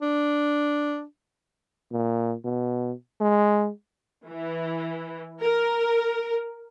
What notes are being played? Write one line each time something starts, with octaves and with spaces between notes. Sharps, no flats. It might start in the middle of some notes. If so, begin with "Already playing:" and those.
D4
A#2
B2
G#3
E3
A#4